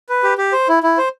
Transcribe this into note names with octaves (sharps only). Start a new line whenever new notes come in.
B4
G4
G4
C5
E4
E4
C5